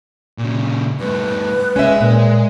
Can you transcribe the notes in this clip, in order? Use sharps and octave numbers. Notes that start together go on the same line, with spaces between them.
A#2 C#3
G2 A3 B4
G#3 C#4 E5
A#2